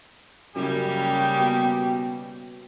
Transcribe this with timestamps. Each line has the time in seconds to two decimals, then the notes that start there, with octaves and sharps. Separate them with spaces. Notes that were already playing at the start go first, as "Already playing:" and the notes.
0.56 F#2 C#3 G3 A#3 G4
1.39 B2